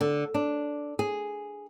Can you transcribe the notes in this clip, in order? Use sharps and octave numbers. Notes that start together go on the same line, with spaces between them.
D3
D4
G#4